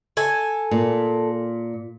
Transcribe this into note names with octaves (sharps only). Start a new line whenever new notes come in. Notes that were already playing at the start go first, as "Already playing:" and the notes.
A4 G#5
A#2